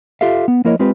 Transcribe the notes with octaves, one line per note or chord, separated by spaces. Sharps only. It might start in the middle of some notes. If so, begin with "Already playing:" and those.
F4 G4 A4 E5 F5
B3
F3 A#3 E4 A#4 C#5 D#5
G#3 C4 F4 G4 B4